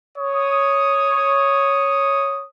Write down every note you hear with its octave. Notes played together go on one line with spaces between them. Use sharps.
C#5 D#6